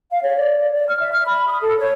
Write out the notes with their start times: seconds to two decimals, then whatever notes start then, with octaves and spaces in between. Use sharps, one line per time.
0.11 F5
0.23 C#5
0.37 D5
0.58 D5
0.74 D5
0.89 F6
1.01 E5
1.12 F6
1.26 B5
1.48 D#6
1.62 A4
1.78 C#5